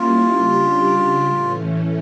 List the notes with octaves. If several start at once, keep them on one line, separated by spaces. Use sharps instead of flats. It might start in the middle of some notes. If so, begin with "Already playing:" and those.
Already playing: G3 A#3 C#4 E4 F4
C#3 G3 D4 G4
A2 E3 A3 C#4